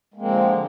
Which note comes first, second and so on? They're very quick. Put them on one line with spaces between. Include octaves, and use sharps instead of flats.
G#3 A#3 C4 F3 D3